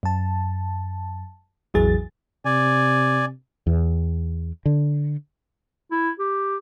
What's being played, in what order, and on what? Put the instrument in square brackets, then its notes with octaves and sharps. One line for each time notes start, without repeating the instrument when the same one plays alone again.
[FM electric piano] F#2 A5
A1 E2 E3 F#3 G#4 A6
[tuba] C3 [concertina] D5 G#5
[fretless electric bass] E2
D3
[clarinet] E4
G4